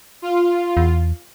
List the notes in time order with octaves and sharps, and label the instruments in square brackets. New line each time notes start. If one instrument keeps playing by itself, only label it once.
[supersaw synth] F4
[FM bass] E2